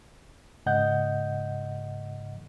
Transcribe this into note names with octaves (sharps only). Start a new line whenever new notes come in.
G#2 C#3 D#5 F#5 G6